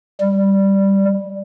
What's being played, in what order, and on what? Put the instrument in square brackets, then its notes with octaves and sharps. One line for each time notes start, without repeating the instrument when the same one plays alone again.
[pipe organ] G3